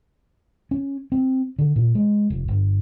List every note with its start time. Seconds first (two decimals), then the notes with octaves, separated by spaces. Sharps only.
0.71 C#4
1.12 C4
1.59 D3
1.76 A#2
1.95 G#3
2.30 F1
2.48 G1